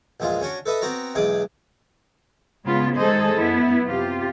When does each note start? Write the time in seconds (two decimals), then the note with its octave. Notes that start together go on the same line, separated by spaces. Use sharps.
0.20 A#1 E2 G#3 F4
0.41 C#4 D4 F#4
0.66 A4 B4 D#5 E5
0.82 B3 C4 F#4 D5 A#5
1.15 B1 E2 G#3 G#4 D6
2.64 C#3 G#3 B3 F4
2.97 D#3 G#3 G#4 A4 C5 D#5
3.36 F#2 B3 E4
3.86 C3 F4 G4